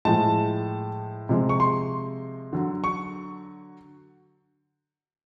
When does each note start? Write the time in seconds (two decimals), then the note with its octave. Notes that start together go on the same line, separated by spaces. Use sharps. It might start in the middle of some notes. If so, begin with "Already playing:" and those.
0.05 A2 F3 G#3 A5
1.29 C3 F3 G#3
1.49 C#6
1.60 C6
2.53 D3 F#3
2.84 C#6